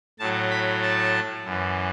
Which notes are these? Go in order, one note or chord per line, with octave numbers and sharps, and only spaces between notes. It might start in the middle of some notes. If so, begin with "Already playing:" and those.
A2 F#3 A5
B5
A5
F#2 E3